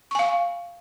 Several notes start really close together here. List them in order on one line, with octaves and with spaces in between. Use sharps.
C#6 G#5 F5